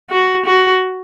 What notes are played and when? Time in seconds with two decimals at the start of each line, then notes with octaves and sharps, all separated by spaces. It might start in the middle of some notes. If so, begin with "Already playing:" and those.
0.11 F#4
0.46 F#4